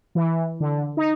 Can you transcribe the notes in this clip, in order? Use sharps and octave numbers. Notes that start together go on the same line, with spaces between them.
E3
D3
D#4